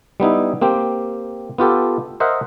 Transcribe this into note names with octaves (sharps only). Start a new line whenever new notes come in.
G3 B3 D#4 E4
A#3 C4 G4
B3 F4 G4 A4
A#4 C5 D#5 E5 F#5